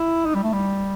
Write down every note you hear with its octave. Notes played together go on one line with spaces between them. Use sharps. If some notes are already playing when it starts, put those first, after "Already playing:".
Already playing: E4
D#4
G3
A3
G3